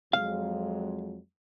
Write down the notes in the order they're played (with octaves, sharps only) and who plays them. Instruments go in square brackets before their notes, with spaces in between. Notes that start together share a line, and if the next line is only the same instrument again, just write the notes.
[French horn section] F2 F#3 G#3 [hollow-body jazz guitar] F5